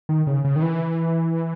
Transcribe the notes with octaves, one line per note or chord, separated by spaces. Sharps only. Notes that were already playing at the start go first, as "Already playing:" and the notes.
D#3
C#3
C#3
D#3
E3